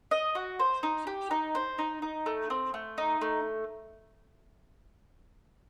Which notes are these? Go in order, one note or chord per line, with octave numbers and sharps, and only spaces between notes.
D#5
F#4
C5
D#4
G4
D#4
C5
D#4
D#4
A3
C4
A3
D#4
A3